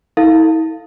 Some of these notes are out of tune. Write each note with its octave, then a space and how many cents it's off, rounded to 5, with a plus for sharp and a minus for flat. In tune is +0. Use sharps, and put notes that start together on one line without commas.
E4 -45 A4 +15 F5 +0